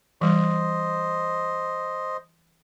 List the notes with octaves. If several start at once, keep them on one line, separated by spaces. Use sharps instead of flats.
E3 G3 C5 D#5